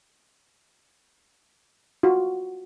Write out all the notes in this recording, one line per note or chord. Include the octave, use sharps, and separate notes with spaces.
F4 F#4